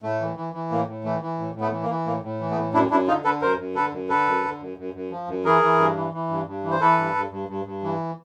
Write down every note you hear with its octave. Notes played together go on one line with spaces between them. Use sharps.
A2 A3
E3
E3
E3
A2 A#3
A2
E3 A3
E3
A2
A2
A3 B3
E3
A#3
E3
A2 A#3
A2
E3
A3 B3
A2
F#2 D4 E4
F#2 D4 E4
D3 D#4 F4
D3 A4 B4
F#2 A#4 C5
F#2
D3 A4 B4
F#2
D3 A4 B4
F#2
D3
F#2
F#2
F#2
F3
F#2
E3 G#4 A#4
E3
G2
E3
E3
G2
G2
E3
C5
E3 A4 B4
G2
G2
G2
G2
G2
E3